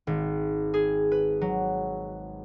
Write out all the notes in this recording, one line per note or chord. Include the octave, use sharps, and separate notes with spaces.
G#1
G#4
B4
F#3